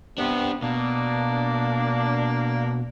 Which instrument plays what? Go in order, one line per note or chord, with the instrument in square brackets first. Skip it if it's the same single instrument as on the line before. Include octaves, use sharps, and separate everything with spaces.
[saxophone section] C3 B3 [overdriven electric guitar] D4 G4
[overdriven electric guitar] B2 [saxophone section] A#3 D4